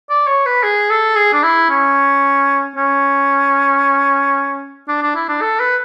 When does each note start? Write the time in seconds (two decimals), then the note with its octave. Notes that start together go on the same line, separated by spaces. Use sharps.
0.10 D5
0.27 C#5
0.46 B4
0.63 G#4
0.90 A4
1.16 G#4
1.33 D4
1.43 E4
1.70 C#4
2.76 C#4
4.88 D4
5.02 D4
5.15 E4
5.29 D4
5.41 A4
5.60 B4